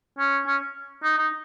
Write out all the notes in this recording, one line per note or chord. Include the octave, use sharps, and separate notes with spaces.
C#4
C#4
D#4
D#4